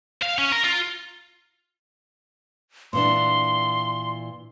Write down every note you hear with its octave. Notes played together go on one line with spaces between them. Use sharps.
F5
C#4
A#4
F4
A#2 E3 D4 C6